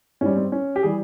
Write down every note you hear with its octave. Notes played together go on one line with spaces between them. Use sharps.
G#2 G3 C#4
C4
C#4
G4
E3 G3 G#4